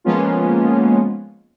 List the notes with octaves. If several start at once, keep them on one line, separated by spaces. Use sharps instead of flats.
F3 G#3 A#3 B3 C#4 F4